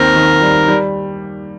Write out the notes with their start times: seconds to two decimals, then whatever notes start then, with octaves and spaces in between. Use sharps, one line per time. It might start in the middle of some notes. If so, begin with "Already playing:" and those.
Already playing: D#2 D#3 C4 A#4
0.15 D#3
0.41 G3
0.68 G3